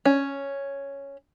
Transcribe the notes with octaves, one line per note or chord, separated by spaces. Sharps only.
C#4